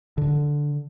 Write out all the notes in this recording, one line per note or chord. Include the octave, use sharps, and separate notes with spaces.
D3